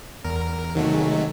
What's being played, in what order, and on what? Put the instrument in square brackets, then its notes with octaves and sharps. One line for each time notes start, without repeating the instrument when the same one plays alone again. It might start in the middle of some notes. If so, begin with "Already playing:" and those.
[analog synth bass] E2 [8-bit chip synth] A#4
[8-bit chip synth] C3 F#3 A3 [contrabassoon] D#3
[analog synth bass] G#3